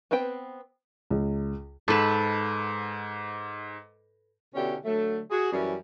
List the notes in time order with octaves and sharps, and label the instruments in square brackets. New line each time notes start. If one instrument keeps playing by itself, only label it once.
[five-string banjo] B3 C4 B4 G5
[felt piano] C#2
[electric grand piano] G#2 E7 [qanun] A4 B4
[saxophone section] B2 D3 C#4 E4 G4
D3 F#3 A3
F#4 G#4
F#2 E3 G3 C#4